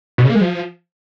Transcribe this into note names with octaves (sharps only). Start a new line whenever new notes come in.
B2
C#3
A#3
G#3
F3